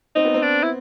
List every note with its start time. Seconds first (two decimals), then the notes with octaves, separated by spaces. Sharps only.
0.15 C4 D#4
0.25 B3
0.34 C4
0.42 D4
0.63 E4